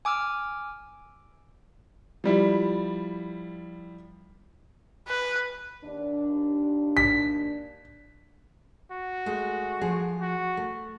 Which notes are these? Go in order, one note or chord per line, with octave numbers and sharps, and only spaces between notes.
G#5 D6 E6 F6
F3 G3 E4
B4
D#2 D4
B6
F#4
G#3 A3
F3 G#4
F#4
A3